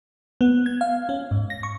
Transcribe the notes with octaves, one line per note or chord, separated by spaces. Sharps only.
B3
G#6
F5
C#4
G#2
A#6
C#6